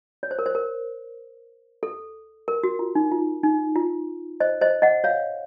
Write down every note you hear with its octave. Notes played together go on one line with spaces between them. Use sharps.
C#5
C5
A#4
C5
A#4
A4
A#4
F#4
F4
D#4
F4
D#4
F4
C5 D#5
C5 D#5
D#5 F#5
C#5 F5